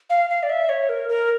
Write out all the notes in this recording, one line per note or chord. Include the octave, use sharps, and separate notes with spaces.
F5
F5
D5
E5
C#5
A#4
A#4